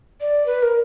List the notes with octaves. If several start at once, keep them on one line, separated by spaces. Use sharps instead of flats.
D5
B4
A#4